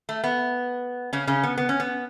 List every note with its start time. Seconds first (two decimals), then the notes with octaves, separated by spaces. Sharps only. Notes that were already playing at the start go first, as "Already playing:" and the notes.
0.09 A3
0.24 B3
1.13 C#3 C#4
1.27 C#3 C#4
1.43 B3
1.58 B3
1.69 C#4
1.80 B3